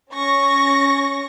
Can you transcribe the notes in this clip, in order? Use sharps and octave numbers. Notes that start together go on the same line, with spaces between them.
C#4 C#6 A#6